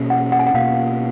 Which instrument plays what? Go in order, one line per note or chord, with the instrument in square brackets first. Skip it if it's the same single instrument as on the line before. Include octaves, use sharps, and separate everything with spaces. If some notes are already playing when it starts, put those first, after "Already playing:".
Already playing: [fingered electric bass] B2 A#3 C#4
[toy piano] F#5
F#5
G#5
F#5
[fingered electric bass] B2 A#3 C#4 [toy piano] F5